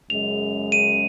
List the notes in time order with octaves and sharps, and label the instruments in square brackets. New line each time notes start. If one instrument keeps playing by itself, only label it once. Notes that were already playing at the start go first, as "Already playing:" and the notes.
[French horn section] F#2 C#3 G#3 [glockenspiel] F7
[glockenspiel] D#7